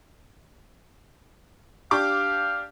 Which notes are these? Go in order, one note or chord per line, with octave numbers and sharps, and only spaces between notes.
D4 G4 F5 D6